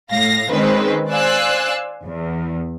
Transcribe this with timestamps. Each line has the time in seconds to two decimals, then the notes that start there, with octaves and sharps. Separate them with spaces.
0.11 A2 F5 A#6
0.50 D#3 G#3 C4 C#4 B4 C5
1.10 C5 D5 F5 G#5 E6 F#6
2.05 E2